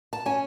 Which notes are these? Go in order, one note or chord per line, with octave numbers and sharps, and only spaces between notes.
A5
C#4 G#5